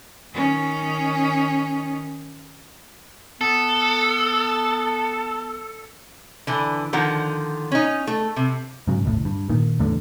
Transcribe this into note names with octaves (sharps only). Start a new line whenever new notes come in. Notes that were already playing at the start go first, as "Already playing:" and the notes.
D#3 C#4
B3 A4
D3 E3
D3 D#3 F3 F#5
C#4 D#4
A3
C3
G#2 C#3 F#3
G1 D2 A2
G2
A#2 D#3
E2 A2 D3